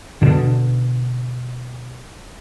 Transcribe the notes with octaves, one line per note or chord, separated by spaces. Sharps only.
B2 D3